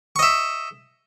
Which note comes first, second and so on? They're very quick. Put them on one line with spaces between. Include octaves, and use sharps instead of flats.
C#6 D#5 E5